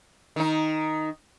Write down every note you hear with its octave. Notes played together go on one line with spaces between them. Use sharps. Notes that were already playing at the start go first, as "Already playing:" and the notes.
D#3 D#4